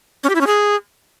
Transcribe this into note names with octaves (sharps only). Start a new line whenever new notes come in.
C#4
G4
E4
C#4
G#4